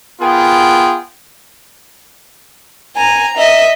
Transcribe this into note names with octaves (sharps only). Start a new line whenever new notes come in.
B3 F4 G#4 A#4 G5
G#5 A#5
D#5 E5